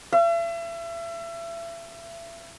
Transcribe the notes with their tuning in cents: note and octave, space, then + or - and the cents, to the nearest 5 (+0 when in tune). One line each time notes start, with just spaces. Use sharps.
E5 +35